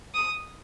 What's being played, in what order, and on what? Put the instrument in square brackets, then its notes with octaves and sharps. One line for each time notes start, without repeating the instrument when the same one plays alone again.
[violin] D#6